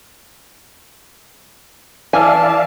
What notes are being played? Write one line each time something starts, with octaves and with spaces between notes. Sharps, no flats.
E3 D5 E5 F5 G#5 A5